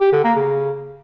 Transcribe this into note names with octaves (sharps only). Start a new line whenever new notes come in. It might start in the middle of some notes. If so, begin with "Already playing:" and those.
G4
D3
A#3
C#3